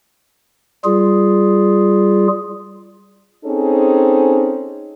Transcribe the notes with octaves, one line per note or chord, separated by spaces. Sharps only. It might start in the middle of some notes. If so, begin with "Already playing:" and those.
G3 F4 G#4
C4 C#4 D#4 G#4 A4 C5